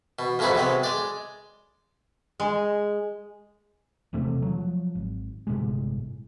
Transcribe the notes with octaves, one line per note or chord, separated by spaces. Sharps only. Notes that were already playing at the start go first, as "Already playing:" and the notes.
B2
F2 G#2 B2 E4 G#4 B4
C3 F#3 G#3 B3
G#3 D5
G#3
E1 E2 C3 A3
F3 F#3
G#1
G1 A2 C3 G#3